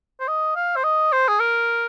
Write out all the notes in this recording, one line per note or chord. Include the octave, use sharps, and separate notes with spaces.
C5
D#5
F5
C5
D#5
C5
G#4
A#4